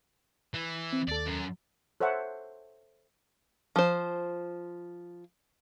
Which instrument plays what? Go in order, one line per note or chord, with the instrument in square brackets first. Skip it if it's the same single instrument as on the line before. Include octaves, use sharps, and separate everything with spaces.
[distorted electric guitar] E3
[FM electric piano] C4
[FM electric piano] D#2 A4 [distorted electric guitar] D5
[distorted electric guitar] F#2
[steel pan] A4 C5 C#5 E5 F#5
[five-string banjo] F3 C5